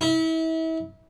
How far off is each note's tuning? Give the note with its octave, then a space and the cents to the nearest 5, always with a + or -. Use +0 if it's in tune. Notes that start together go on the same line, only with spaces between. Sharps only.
E4 -35